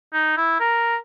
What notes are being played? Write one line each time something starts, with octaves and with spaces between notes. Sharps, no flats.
D#4
E4
A#4